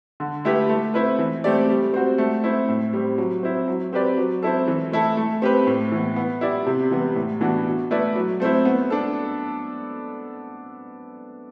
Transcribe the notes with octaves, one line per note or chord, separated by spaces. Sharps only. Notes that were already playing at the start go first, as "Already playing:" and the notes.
D3
A3 E4 G4 B4
A3
C4 E4 B4
E3
A3 C4 G4 D5
G3
C4 F#4
A3
C4 E4
A2
G3 C4
F#3
C4 E4
F#3
C4 G4 B4 D5
F#3
C4 E4 A4
E3
A3 E4 A4
A3
C4 G4 B4
A2
E3 B3
B3
E4 G4 D5
C3
E3 G3 B3
A2
E3 B3 D4 F#4
B2
A3 E4 B4 D5
F#3
A3 C4 E4
B3
D4 A4